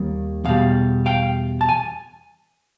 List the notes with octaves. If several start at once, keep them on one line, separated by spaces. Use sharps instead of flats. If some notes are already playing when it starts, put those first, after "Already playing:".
Already playing: D#2 D#3 G3 A#3
E2 B2 G3 F5
F5 G5
A5
G#5